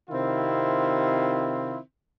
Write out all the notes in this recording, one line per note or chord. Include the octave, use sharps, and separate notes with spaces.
C3 D#3 C4 E4 F4